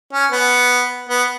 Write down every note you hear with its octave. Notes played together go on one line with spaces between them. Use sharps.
C#4
B3
B3